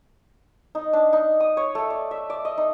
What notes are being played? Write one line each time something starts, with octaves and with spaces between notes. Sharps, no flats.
D#4
D4
D#4
D#6
C#5
A3
D5
E5
D5
D#5
D#4